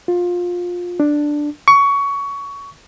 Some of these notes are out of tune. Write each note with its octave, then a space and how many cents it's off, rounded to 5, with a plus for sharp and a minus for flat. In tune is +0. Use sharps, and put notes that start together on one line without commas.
F4 +20
D4 +5
C#6 +20